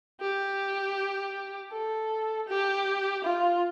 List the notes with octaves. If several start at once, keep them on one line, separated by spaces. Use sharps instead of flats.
G4
A4
G4
F4